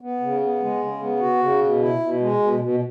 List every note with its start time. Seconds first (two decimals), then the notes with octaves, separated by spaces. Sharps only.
0.01 B3
0.20 C#3
0.40 B3
0.61 G#3
0.80 C#3
1.00 B3
1.20 F#4
1.40 C#3
1.61 B2
1.80 E4
2.00 B2
2.20 G#3
2.39 B2
2.60 B2